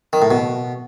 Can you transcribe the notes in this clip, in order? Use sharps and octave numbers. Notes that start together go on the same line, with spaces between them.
D#3
A2
B2